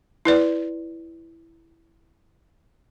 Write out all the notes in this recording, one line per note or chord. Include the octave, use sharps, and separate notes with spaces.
E4 B4 D5